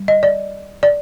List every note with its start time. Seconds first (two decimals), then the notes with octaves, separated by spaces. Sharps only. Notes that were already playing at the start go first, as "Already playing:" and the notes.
Already playing: G3
0.08 D#5
0.23 D5
0.83 D5